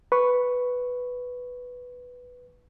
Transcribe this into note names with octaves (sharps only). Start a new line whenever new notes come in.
B4 C#6